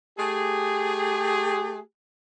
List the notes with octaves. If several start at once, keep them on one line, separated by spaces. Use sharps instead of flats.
A3 G4 G#4